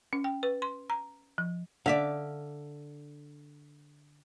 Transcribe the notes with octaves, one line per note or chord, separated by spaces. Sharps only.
C#4
G5
B4
C6
A#5
F3
D3 D5 E5 F5